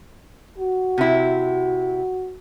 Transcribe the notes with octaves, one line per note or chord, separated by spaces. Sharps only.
F#4
C3 E4